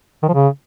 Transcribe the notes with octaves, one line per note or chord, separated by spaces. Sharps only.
D#3
F3
C#3